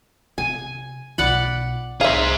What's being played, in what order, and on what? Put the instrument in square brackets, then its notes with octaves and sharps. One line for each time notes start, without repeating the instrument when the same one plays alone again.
[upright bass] C3 [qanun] G#5
[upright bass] B1 F4 [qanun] D5 F#5 B5
[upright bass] C2 [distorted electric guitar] G#4 C5 [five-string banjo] E5 F5